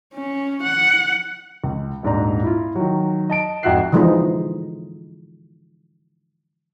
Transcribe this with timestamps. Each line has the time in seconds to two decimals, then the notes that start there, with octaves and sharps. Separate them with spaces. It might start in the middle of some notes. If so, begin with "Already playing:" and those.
0.14 C#4
0.63 F#5
1.64 C#2
2.03 D#1 G#2 D4 A#5
2.43 E4 F4
2.75 D#3 F#3
3.30 D#5 A5 D7
3.63 F2 G#2 F#4 E5 F#6 C7
3.92 D3 E3 F3 G#3 B3 D#4